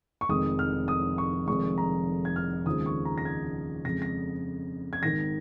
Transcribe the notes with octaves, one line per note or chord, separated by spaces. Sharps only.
C#6
F1 F2 D#3 G#3 D#6
F6
D#6
C#6
F1 F2 D#3 G#3 C#6
A#5
G#6
F6
D#2 C#3 F3 G#3 D#6
C#6
A#5
A#6
G#6
F2 C#3 F3 G#3 A#6
A#6
G#6
G#1 G#2 D#3 A#6